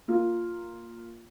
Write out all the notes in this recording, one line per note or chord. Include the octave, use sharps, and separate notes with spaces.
A#3 F4